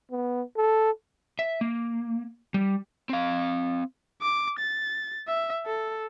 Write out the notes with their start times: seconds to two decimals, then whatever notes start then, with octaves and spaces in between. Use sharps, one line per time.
0.11 B3
0.57 A4
1.39 E5
1.61 A#3
2.54 G3
3.09 C4 F5
4.21 D6
4.59 A6
5.27 E5
5.66 A4